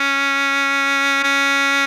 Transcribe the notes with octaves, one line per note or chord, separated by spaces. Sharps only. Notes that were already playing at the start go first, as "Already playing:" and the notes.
Already playing: C#4
C#4